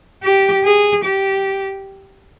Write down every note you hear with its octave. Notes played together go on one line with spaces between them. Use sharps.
G4
G#4
G4